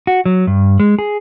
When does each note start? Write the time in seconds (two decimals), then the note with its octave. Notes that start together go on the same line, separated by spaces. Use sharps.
0.07 F#4
0.26 F#3
0.47 G2
0.80 G#3
0.99 G#4